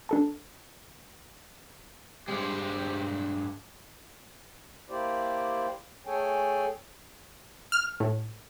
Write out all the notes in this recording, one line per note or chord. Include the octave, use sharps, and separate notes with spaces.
D4 A4 A5
G2 G3 G#3 C4 G4
A#3 E4 G4 C5 D5
A3 G#4 A4 C#5 G5 G#5
F6
A2